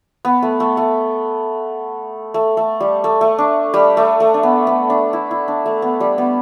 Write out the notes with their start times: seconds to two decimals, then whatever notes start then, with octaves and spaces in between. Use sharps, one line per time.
0.25 B3
0.43 A3
0.60 A3
0.77 A3
2.34 A3
2.57 A3
2.81 G3
3.04 A3
3.21 A3
3.39 D4
3.74 G3
3.97 A3
4.20 A3
4.34 D4
4.43 B3
4.67 B3
4.90 D4
5.13 E4
5.31 E4
5.48 D4
5.66 A3
5.82 B3
6.00 G3
6.18 B3